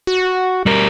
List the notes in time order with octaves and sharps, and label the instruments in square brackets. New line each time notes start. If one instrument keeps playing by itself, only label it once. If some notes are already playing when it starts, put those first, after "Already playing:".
[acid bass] F#4
[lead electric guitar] G3 A#4